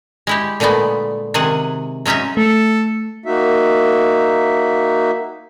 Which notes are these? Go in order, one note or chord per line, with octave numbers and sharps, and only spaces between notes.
G#3 E4 G4
A#2 D3 G#3 A3 B3
C3 D#3 G#4 F#5
F#3 G#3 C#4 D#4 E5
A3 A4
A#3 D#4 F#4 E5